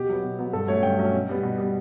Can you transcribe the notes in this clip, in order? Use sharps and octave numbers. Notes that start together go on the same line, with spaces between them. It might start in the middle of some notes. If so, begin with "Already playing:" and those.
Already playing: B2 G4
F#3 B3
B2
F#3 B3
G2 A4
F#3 A3 C#4 C#5
G2 G5
F#3 A3 C#4
B2
G3 B3
B2
G3 B3